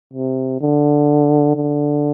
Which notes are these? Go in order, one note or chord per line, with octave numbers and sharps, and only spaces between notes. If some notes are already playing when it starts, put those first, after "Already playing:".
C3
D3
D3